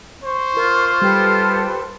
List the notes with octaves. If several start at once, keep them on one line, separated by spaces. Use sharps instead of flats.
C5 C#6
F4 A#4
G3 G4 A4 B4